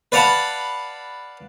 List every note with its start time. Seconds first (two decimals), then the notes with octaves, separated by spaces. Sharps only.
0.12 B4 D5 F5 F#5 A5 B5